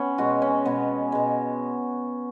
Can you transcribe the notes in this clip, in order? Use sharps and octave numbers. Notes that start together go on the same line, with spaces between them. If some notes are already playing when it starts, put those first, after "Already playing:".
Already playing: B3 C#4
B2 G#3 F#4
C#4
B2 G#3 B3
B2 G#3